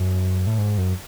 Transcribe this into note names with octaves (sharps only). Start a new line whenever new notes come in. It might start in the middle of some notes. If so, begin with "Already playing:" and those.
Already playing: F#2
A2
G#2
F#2